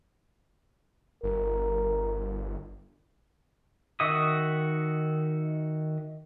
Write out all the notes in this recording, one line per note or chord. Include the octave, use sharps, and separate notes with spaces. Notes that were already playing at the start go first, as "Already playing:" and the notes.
G1 A#4
D#3 F#4 D#5 E5 D#6